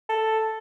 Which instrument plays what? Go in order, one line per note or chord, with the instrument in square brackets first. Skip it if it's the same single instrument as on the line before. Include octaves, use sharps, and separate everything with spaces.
[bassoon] A4